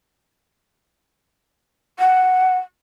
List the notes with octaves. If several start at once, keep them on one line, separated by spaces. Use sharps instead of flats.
F#5